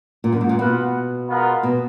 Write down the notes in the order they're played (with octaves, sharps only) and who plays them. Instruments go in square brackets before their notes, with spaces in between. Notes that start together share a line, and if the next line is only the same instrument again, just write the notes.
[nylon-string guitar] A#2
F#2
G#2
A#2
[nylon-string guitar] B2 [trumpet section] F4 B4 F#5
[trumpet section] G#3 B3 F4 A#4
[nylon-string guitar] B2